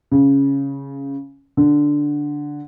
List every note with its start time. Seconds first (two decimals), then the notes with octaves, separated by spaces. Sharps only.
0.11 C#3
1.57 D3